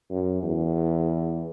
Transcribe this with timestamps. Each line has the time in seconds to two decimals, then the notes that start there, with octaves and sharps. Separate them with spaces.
0.11 F#2
0.43 E2